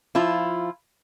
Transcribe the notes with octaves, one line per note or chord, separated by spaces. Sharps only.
F3 E4 F4